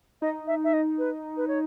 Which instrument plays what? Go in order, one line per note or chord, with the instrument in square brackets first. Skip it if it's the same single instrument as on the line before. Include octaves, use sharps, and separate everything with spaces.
[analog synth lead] D#4 [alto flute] D#5
[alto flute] E5
E5
D#5
B4
B4
C#5